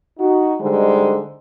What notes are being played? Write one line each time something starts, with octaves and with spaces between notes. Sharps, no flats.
D#4 F#4
D3 G3 G#3 D#4 C5